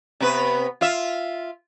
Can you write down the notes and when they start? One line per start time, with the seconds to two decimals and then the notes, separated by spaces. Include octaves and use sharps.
0.20 C3 B3 B4
0.81 F4 E5